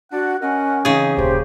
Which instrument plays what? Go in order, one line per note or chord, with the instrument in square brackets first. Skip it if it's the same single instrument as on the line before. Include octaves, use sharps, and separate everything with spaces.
[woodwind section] D4 D5 F#5 [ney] F#4
[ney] C#4 [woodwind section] A#4 D#5 F#5
[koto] C#3 G#4 [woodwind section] E3 C4 D#4
[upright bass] D#1 F2 [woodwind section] C3 G4 [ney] C5